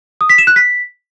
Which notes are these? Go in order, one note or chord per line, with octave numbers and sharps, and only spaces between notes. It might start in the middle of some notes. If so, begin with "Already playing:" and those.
D#6
B6
E7
F#6
B6